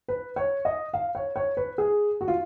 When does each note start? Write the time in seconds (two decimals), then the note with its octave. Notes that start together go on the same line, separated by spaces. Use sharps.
0.08 B4
0.36 C#5
0.65 D#5
0.94 F5
1.15 C#5
1.36 C#5
1.57 B4
1.78 G#4
2.21 F#4
2.28 F4